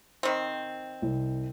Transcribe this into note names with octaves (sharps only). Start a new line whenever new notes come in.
D#3 C4
C2